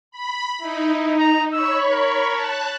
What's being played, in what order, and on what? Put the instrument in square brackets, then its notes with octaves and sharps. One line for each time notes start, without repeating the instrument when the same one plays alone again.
[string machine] B5
[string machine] D#4 [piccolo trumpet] E4
[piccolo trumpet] A#5
[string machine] C#5 B5 C#6 [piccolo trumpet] E6
[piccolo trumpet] A#4
[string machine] A5 F#6